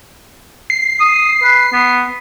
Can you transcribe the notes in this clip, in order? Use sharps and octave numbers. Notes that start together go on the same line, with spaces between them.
C7
D#6
B4
B3